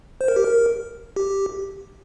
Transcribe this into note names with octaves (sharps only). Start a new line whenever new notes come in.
C5
A#4
G4
A#4
G4